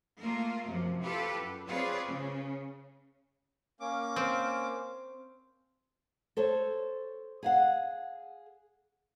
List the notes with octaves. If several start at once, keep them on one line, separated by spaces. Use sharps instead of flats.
A3 A#3 F4 A#4
F#2 C3 F3
F4 G4 A4 B4
F#2
C4 F4 G#4 B4 C#5 D5
C#3
A#3 C#4 D6
C4
A4 C5 C#5
G#4 F5 F#5